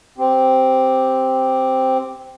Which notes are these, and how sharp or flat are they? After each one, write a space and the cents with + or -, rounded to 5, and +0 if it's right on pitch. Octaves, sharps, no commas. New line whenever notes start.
C4 +0 G4 +0